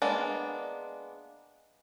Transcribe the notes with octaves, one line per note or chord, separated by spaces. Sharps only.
G#3 A#3 B3 D4